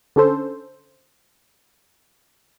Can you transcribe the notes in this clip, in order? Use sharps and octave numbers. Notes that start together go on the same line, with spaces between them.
D3 C#4 A4 C5